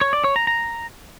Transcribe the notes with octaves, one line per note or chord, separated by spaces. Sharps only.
C#5
D5
C#5
A#5
A#5